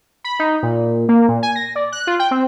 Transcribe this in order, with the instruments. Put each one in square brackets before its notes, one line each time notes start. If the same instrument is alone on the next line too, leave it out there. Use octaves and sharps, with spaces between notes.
[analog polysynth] B5
D#4
A#2
A#3
A#2
G#5
A#6
D5
F#6
F4
G5
C4